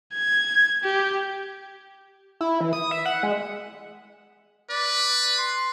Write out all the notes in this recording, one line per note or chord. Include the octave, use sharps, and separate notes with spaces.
G#6
G4
E4
E3
D#6
E5
F#5
G#3
B4 D5
C6